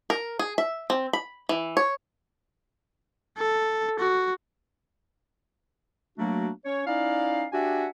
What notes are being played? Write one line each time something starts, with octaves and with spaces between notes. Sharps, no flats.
A#4
G#4
E5
C4
B5
E3
C#5
A4
F#4
F#3 A3 A#3 D4 F#4
C#4 C#5
C#4 D#4 E4 D5 F5
D4 F#4 G4 E5 F#5 G#5